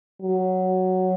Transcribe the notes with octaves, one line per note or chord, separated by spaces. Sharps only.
F#3